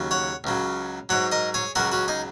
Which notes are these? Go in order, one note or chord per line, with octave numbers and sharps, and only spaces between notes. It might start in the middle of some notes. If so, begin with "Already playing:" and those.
Already playing: D#2 C#3 F#3
C#5 F#5
C#2 C#3 F#3
G#2 F#3 C#5 F#5
A#4 D#5
G#4 C#5
C#2 C#3 F#3 F#4 A#4
C#4 F#4
D#4 G#4